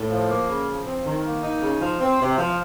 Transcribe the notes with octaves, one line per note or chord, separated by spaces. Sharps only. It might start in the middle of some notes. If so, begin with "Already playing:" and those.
Already playing: A2
F3
A#3
C#3
F3
C4
D#3
A#3
D#4
C#3
F3
C4
C3
F3